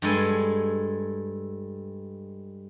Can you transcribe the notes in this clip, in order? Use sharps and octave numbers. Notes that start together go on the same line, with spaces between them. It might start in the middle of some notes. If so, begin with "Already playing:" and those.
G2 G#3 A4 G#5